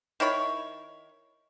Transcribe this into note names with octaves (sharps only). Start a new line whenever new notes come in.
D#3 E4 C#5 B5